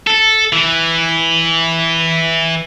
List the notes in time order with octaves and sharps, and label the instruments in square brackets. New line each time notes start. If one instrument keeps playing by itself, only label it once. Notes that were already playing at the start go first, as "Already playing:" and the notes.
[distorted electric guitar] A4
E3